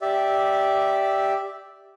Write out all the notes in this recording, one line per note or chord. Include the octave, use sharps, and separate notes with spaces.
G4 D5 E5